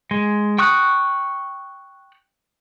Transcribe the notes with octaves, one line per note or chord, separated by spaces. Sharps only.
G#3
G5 C#6 D#6 F#6